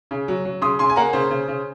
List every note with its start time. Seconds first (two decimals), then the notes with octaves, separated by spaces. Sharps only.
0.11 C#3
0.28 F#3
0.45 F#3
0.62 C#3 C6 D#6
0.79 C#3 G#5 C6
0.90 G#5
0.96 A#3 F#5 A#5
1.13 C#3 C5
1.30 C#3
1.48 C#3